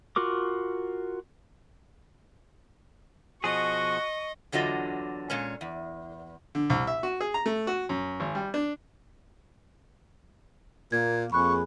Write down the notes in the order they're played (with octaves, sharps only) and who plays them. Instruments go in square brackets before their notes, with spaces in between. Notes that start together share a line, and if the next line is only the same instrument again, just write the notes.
[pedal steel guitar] F4 F#4 A#4 D6
[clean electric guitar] B2 F3 G#4 [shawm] F#4 [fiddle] D#5 [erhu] C#6
[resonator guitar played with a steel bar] E2 D3 F#3 F4 D#5
A#2 G#3 C#4
E2
[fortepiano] D3
C2
E5
F#4
G#4
A#5
A3
F#4
F#2
G#1
G3
D4
[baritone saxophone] A#2 [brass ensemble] A#3 [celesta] G#6
[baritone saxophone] F2 [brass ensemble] A#3 G#4 [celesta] B5 F#6 [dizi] C#6